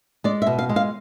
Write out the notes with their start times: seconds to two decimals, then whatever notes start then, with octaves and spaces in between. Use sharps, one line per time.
0.24 G#3 D5
0.42 E5
0.47 B2
0.59 F5
0.69 G#3
0.76 F5